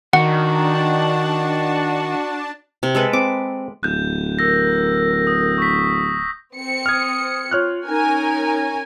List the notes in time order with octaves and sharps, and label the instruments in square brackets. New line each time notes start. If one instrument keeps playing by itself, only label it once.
[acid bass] D#3 [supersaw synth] D4 A5 [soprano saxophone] F#4 [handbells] F#5
[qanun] C3
G#3 A4 B4
[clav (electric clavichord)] C4 [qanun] D6
[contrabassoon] D1 [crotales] F#6 G6
[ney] A#4 [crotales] E6 A#6
[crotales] D#6
C#6 B6
[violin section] C4 C#7
[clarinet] D#6 [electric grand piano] F6 G#6
[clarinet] F4 [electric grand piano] C#5 F6 F#6
[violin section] C#4 A#4 G#5 [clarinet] D#4